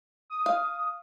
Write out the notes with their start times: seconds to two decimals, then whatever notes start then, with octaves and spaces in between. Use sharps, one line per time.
0.30 D#6
0.46 F5